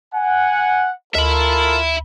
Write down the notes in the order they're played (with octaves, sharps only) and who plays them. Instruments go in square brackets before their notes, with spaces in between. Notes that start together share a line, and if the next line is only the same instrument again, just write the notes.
[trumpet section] F#5 G#5
[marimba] D2 [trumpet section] F4 A4 A#4 [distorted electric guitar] E5 B5